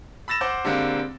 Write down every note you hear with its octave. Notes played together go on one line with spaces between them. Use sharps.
B5 E6 A6 A#6 E7
C5 F#5 C6 D6 G6
D3 G3 G#3 A#3 C4